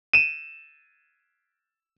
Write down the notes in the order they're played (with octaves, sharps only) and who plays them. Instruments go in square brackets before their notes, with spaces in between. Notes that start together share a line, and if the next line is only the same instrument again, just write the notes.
[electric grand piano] D#7 E7